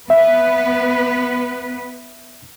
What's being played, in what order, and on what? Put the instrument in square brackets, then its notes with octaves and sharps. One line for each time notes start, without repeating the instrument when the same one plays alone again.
[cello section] B3 B4 [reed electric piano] E5